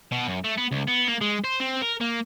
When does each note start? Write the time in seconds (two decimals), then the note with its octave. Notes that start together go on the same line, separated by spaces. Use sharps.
0.12 B2
0.27 F#2
0.44 A3
0.58 B3
0.71 C#2
0.87 B3
1.08 A#3
1.21 G#3
1.44 C5
1.60 C4
1.82 A#4
2.01 A#3